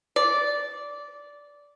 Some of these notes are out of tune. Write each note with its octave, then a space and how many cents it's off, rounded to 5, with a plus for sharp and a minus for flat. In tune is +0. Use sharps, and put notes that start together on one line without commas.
D5 -15